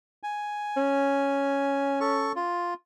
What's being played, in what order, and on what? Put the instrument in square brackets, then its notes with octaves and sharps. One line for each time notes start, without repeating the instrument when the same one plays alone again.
[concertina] G#5
[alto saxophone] C#4
[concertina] A4 C#6
F4